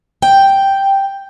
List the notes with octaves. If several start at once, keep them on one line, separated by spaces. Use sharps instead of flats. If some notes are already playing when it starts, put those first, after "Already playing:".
G5